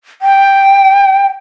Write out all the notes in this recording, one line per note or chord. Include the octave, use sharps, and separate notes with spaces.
G5